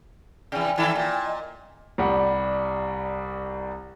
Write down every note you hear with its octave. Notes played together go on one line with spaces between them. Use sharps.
C3 E3 D5 G5 G#5
D#3 E4 A4
A#2
D#5
C2 G3 F#5